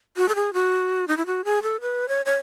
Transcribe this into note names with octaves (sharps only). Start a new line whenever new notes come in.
F#4
A4
G#4
F#4
D#4
E4
F#4
G#4
A4
B4
C#5
C#5